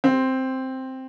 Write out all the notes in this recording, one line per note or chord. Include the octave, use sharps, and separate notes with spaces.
C4